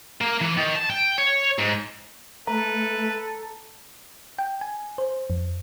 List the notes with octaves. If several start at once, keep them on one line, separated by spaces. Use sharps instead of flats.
A#3
E3
D#3
A5
G5
C#5
G#2
A3 A4 B4 A#5
G5
G#5
C5
F2